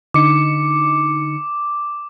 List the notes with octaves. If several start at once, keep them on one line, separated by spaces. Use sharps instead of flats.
D3 D#4 D6 C#7